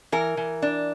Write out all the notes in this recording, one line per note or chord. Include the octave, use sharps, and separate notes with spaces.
E3 A#4
E3
D4